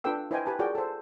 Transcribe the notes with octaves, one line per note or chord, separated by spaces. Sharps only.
D4 F4 A4 B4 G5 E6
E4 B4 C5 D#5 G5 G#5
G4 B4 G#5 A5
F4 F#4 G#4 A#4 D5 G5
A4 C5